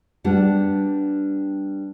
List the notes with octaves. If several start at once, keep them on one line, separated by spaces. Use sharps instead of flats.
G3 B3 D4 G4 F#5